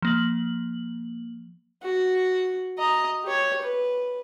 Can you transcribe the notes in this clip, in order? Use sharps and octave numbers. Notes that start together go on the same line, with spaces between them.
F3 A#3 F#7
F#4
D#5 A#5
G4 C#5
B4